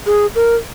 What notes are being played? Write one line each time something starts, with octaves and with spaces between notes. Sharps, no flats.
G#4
A#4